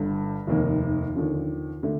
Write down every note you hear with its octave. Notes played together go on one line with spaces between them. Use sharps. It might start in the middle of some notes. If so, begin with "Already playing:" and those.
Already playing: G1 G2 D3
F1 D#2 D#3 A#3
D#2 D3 F3
D3 A3